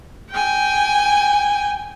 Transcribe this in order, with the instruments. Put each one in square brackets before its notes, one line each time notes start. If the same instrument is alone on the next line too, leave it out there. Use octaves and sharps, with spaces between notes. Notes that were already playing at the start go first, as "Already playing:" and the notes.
[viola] G5 G#5